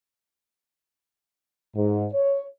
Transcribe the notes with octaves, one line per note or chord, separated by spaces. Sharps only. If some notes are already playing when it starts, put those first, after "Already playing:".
G#2
C#5